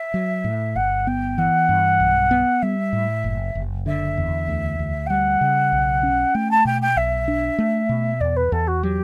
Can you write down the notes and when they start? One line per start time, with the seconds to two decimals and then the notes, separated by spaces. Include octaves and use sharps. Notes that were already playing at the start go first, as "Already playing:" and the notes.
Already playing: E5
0.14 F#3
0.44 A2
0.76 G1 F#5
1.07 B3 G5
1.38 E3 F#5
1.69 G2
2.00 B1
2.31 B3
2.62 G3 E5
2.93 A2
3.24 F#1
3.55 F#1
3.86 D3 E5
4.17 E2
4.48 D2
4.79 D2
5.06 G5
5.10 G3 F#5
5.41 C#3
5.72 B1
6.03 C#4
6.35 A3 G5
6.51 A5
6.65 B2 G5
6.82 G5
6.96 B1 E5
7.28 D4
7.58 A3
7.89 B2
8.20 E2 D5
8.36 B4
8.52 E2 A4
8.67 F#4
8.83 F#3 G4